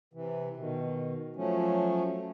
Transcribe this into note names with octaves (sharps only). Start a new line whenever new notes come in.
C3 E3
B2 D#3
F3 F#3 A3 C#4